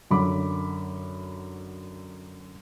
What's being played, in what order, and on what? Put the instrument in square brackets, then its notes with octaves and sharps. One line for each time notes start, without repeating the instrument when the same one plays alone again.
[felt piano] F#2 D3 B5 D6